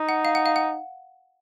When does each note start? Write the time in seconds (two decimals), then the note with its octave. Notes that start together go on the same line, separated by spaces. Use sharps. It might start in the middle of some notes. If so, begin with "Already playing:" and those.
Already playing: D#4
0.09 F#5
0.25 F5
0.35 F#5
0.46 F5
0.56 F#5